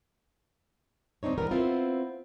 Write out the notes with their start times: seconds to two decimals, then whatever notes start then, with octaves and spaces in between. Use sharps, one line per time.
1.23 D#2 C4 D4 D#4 C#5
1.38 E3 G3 B3 A#4
1.51 B3 C4 E4 F4